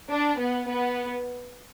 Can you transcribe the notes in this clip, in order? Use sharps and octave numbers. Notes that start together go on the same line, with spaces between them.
D4
B3
B3